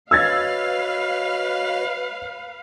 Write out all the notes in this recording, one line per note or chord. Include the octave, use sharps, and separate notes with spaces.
F#4 B4 C#5 D#5 F5 E6 G#6 A6